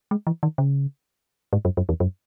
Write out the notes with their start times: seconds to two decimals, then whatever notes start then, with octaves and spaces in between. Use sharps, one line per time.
0.11 G#3
0.27 E3
0.43 D#3
0.58 C#3
1.53 G#2
1.65 F#2
1.77 F#2
1.89 E2
2.00 F#2